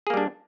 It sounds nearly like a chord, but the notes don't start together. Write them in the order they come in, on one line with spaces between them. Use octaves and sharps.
G#4 A#3 G3 D4